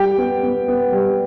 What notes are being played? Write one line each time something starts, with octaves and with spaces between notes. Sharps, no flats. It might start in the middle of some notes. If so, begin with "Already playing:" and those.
Already playing: G3 G4 G5
B3
B3
B3
G3